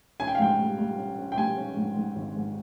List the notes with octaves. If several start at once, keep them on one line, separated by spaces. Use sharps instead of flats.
C#4 G#5
G5
F5
G#2 G5
G3
G3
C#4
C#4
G5
G3 G#5
C#4
G#2
G#2
G#1
G#2